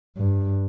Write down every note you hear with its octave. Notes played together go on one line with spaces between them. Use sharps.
G2